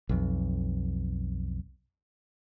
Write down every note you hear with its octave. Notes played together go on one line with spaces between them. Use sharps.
B1 F2